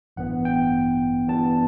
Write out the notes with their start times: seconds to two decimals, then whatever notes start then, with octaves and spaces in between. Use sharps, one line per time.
0.17 A1 G2 E3 B3 F#5
0.45 G5
1.28 G2 E3 G3 B3 A5